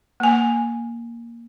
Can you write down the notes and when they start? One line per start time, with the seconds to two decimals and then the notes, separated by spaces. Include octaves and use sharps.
0.20 A#3 G#5